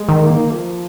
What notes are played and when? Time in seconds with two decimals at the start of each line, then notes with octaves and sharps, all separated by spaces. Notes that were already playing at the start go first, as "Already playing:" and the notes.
Already playing: G#3
0.09 D#3
0.23 A#3
0.52 F3